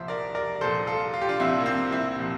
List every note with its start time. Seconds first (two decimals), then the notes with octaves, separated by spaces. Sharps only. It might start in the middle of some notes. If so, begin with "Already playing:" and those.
Already playing: C2 A#2 F3 C5 E5
0.08 A#4 D5
0.35 A#4 D5
0.61 C2 A#2 F3 A4 C5
0.87 F4 A4
1.14 F4
1.21 G4
1.29 D4 F4
1.39 C2 A#2 F3 C4 E4
1.60 A#3
1.66 C4
1.92 C4 E4
2.19 A#2 F3